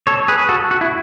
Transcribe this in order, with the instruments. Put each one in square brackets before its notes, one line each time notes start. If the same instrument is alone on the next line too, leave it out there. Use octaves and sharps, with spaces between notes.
[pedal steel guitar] A4 C#5
G#4 B4
F#4 A4
F#4
E4